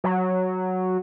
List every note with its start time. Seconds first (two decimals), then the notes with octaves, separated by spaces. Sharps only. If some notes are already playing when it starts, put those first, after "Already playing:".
0.04 F#3